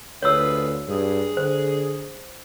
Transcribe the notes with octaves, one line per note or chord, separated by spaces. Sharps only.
D2 F4 G#4 B4 C#5 E6
G2 G#4
D3 C5